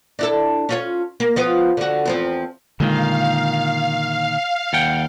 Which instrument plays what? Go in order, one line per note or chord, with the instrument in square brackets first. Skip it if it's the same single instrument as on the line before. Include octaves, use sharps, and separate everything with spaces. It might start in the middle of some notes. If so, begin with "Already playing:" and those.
[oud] D4 E4 A4
C#4 F4 C#5
A#3
F3 B3 F4
D3 F#4
E2 F3 C4
[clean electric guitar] A#2 D#3 [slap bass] D3 G#3 [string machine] F5
[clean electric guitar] D#2 F#5 G5